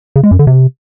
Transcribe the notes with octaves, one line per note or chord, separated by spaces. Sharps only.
C#3
G#3
F#2
D3
C3